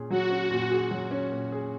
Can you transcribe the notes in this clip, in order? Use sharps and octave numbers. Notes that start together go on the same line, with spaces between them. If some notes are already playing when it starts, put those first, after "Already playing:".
Already playing: A#2 C#4 G#4
F#3 F#4
C#4
A#2
G#4
F#3
C#4
A#2
G#4